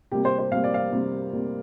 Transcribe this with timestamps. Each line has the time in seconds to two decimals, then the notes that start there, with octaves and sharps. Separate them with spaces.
0.12 C3 G3 A#3 G4
0.25 C5
0.39 C5
0.52 C3 G3 A#3 F5
0.64 D5
0.74 F5
0.93 C3 G3 A#3
1.33 C3 G3 A#3